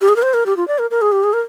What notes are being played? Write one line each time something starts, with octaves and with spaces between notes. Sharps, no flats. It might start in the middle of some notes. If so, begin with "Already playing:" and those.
G4
G#4
A#4
C5
A#4
G4
F4
D5
A#4
A#4
G#4
G4
G#4
A#4